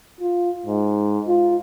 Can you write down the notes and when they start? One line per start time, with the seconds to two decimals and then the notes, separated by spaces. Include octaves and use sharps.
0.21 F4
0.66 G#2
1.28 F4